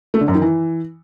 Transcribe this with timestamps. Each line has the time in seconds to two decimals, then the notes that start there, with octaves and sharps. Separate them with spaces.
0.14 A3
0.21 D3
0.28 F#2
0.35 D#3
0.42 E3